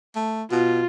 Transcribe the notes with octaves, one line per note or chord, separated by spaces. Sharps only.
A3
B2 F4